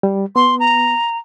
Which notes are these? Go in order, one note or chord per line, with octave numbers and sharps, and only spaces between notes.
G3
B3 C6
A#5